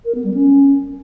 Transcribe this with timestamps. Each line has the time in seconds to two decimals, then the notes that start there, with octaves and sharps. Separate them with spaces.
0.05 A#4
0.15 B3
0.24 G3
0.34 C#4